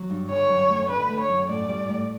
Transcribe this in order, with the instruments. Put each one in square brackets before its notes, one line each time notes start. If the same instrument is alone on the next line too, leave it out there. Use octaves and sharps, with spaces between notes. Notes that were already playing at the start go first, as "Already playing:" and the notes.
Already playing: [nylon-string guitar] F#3
G2
[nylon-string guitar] D3 [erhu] C#5
[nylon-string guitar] F#2
A3
[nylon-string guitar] D3 [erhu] B4
[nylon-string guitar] A3
[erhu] C#5
[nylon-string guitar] F#2
[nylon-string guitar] A2 [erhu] D5
[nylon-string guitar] G3
A2